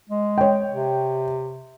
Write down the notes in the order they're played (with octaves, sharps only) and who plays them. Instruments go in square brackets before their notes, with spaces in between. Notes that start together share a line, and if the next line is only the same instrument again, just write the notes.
[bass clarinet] G#3
[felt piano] C#5 G5
[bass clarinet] C3